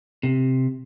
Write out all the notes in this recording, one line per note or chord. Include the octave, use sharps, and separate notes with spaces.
C3